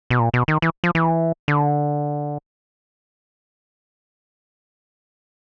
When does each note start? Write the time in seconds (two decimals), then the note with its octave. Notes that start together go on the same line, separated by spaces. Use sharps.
0.10 B2
0.19 A#2
0.34 B2
0.48 D#3
0.62 E3
0.84 F3
0.95 E3
1.48 D3